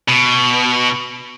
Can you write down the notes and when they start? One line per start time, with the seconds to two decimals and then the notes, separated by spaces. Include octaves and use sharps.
0.09 B2